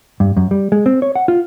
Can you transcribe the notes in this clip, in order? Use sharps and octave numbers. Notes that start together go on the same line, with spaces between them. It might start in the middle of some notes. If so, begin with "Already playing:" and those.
G2
F#2
G3
G#3
C4
C#5
F#5
F4